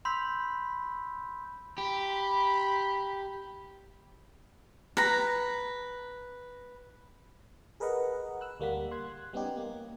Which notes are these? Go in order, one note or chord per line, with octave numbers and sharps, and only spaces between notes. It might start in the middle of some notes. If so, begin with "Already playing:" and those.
B5 C6 E6 G6 B6
G4 B5
B4 A#5
G#4 A#4 B4 D#5 F#5
E6 F#6
D2 G3 A#3 F#5 B6
C6 F#6 G#6
G3 B3 C#4 D#4 G4
A#3